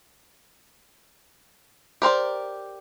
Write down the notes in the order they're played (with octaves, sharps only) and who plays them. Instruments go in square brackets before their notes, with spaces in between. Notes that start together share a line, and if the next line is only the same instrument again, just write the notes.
[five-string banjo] G4 A#4 C5 D5